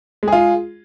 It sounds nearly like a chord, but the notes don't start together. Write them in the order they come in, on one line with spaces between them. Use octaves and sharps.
G#3 G#4 F4